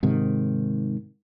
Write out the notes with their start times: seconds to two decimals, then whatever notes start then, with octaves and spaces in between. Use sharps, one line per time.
0.03 G#2 C3 D#3